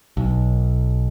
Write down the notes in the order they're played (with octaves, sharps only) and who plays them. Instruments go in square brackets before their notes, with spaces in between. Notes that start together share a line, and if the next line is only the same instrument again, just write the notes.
[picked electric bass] B1